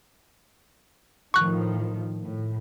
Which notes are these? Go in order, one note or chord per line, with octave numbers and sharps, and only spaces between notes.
A2 D#3 F3 C#6 F#6
A2